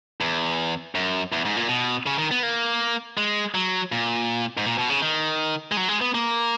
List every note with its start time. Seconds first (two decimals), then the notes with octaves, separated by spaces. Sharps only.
0.21 E2
0.95 F#2
1.32 E2
1.45 G#2
1.57 A#2
1.69 B2
2.06 C#3
2.18 D#3
2.31 B3
2.43 A#3
3.17 G#3
3.54 F#3
3.92 A#2
4.57 G#2
4.66 A#2
4.78 B2
4.90 C#3
5.02 D#3
5.72 G#3
5.77 F#3
5.88 G#3
6.01 B3
6.14 A#3